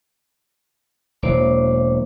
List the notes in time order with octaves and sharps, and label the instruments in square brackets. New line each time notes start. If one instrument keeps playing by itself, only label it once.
[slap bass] E1 E2 F#3 [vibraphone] A#3 C5 D6